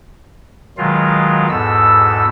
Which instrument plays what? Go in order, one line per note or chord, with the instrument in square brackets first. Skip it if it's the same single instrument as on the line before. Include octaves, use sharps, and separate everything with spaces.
[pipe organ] B2 D#3 F#3 G#3 F4 F5
E2 G#2 B2 A4 E6